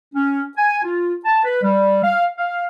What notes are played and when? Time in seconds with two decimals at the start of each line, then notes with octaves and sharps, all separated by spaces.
0.14 C#4
0.56 G#5
0.83 F4
1.24 A5
1.45 B4
1.62 G3
2.04 F5
2.38 F5